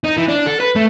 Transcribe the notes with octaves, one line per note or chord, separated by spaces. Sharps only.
D#4
E3
D4
A4
B4
A3